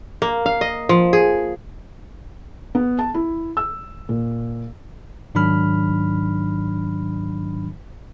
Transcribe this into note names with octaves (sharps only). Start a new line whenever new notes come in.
A#3
F5
D#5
F3
G#4
B3
A5
E4
E6
A#2
G#2 D#3 F#3 D4 B5 F6